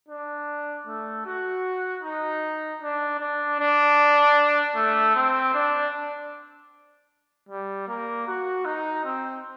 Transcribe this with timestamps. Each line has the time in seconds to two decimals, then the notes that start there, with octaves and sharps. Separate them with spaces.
0.08 D4
0.87 A3
1.26 F#4
2.03 D#4
2.82 D4
3.20 D4
3.60 D4
4.76 A3
5.15 C4
5.54 D4
7.49 G3
7.88 A#3
8.27 F#4
8.65 D#4
9.05 C4